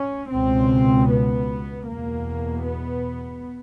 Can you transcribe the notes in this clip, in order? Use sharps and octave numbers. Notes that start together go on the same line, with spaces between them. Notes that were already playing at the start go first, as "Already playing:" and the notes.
Already playing: C#4
C#2 B2 C4
B3
E2 B2 A#3
B3